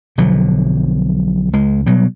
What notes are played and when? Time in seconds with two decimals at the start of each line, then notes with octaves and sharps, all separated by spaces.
0.18 B1 D3 F3 F#3
1.53 C#2 G#3
1.86 B2 F#3 G3